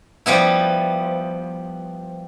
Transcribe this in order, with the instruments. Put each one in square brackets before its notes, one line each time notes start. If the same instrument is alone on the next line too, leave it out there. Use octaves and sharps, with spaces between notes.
[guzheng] F3 G3 B3 E4